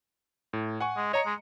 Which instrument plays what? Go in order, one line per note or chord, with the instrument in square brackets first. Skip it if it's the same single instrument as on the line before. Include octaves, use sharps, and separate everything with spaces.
[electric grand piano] A2
F#5 G#5 C#6
[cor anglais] G#3
[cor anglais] C#5 [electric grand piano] D#5 A#5 C#7
[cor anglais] G#3